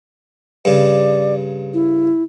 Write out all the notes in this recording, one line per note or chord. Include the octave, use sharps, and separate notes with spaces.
G2 C#3 D5
E4